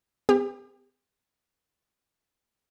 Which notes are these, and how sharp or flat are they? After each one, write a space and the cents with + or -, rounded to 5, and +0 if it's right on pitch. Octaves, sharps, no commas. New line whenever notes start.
B3 +45 G4 +40